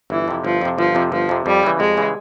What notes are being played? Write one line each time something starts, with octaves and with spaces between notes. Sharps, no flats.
G1 E3
F2 C3
G1 F3
F2 C3
G1 F3
F2 C3
G1 F3
F2 C3
F2 G3
C#3 E3
F2 G#3
C#3 E3